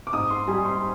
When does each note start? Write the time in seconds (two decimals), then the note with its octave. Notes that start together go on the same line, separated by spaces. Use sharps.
0.07 D6
0.13 G#2 D#6
0.30 C6
0.48 G3 G#5
0.65 C6